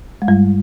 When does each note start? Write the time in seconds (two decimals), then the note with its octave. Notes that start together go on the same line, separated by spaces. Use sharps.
0.22 G#3
0.28 G2 G3